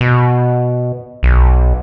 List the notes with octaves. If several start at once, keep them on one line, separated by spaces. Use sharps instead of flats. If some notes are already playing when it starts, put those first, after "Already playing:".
B2
B1